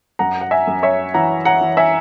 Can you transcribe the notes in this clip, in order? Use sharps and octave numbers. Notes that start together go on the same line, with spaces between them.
F#2 F#5 A#5
F#5
E5 G#5
F#2
C#5 E5
E3 F#5 A#5
F#5 A#5
E3
E5 G#5